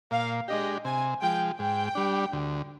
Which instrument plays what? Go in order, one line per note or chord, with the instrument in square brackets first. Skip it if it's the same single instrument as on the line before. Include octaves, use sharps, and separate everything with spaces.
[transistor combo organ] A#2 [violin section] F5
[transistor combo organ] G#3 D4 G4 [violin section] D#5
[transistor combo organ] C3 [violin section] G#5
[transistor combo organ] F3 G#3 [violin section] G5
[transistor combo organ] G#2 [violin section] G5
[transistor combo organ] G3 D4
D2